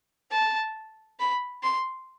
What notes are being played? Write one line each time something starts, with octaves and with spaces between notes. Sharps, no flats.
A5
B5
C6